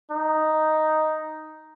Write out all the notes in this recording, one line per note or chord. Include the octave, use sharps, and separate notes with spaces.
D#4